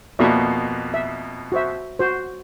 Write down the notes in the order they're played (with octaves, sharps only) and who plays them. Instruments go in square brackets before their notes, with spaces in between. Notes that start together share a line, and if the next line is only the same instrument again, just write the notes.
[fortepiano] F2 B2 A#3 [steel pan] D5 E5 C#6
[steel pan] E5
F#4 C5 E5
F#4 C5